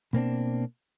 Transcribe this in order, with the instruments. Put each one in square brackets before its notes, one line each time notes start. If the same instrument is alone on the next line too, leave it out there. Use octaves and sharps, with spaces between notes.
[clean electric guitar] B2 A#3 C4 D4